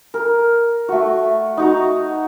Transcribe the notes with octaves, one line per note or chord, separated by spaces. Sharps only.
A#4
A3 F#4
D#4 F#4 A#5